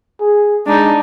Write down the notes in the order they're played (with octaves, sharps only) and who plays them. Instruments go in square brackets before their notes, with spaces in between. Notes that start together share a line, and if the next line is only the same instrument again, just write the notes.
[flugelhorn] G#4
[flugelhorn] G#3 [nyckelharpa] D4 D#4